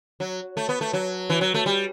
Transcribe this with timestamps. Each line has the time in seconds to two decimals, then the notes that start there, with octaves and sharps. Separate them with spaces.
0.20 F#3
0.57 A3
0.69 B3
0.81 A3
0.93 F#3
1.30 E3
1.41 F#3
1.54 A3
1.66 G3